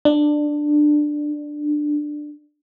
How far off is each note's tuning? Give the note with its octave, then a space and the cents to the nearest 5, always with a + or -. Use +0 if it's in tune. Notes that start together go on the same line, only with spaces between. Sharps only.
D4 +15